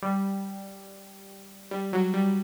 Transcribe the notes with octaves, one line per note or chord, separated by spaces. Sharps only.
G3
G3
F#3
G3